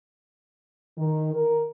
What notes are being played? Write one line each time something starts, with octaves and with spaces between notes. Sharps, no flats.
D#3
A#4